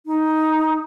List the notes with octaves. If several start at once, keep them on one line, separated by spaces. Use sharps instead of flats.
D#4